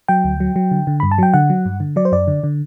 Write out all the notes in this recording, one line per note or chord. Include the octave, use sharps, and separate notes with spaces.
F#3 G5
D2
F#3
F#3
D3
D3
G2 B5
A5
F#3 G5
D3 F#5
F#3
G2
D3
F#3 D5
C5
F#2 D5
D3
D3